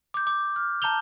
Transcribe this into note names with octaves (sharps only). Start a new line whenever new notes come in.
D6 G6
D6
F6
A5 A#5 G6 F7 G7